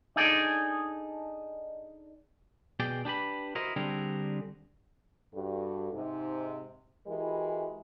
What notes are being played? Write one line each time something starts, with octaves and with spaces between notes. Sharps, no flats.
D4 D#4 G#4 A4 D5
B2 G#4 D5 G5
D4 G4 B4 B5
E4 F#4 A#4 C5 D#5
D3 G3 C4 D4 G#4 A#4
G2 F#4 A4
G#2 C3 D#4
E3 G#3 E4 F#4 G4 A#4